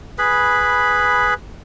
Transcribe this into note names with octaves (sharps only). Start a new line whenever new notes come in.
G#4 B4 B5